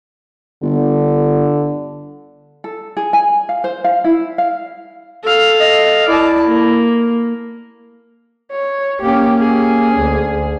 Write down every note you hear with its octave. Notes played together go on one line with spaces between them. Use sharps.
G1 D3
A4
G#4
G#5
F5
C5
F5
E4
F5
A4 F5
D#5
E4 D5 A5
A#3
C#5
A#3 C#4 G4
G#4
D2